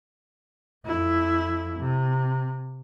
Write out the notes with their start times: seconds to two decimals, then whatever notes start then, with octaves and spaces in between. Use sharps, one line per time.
0.86 F2 E4
1.80 C3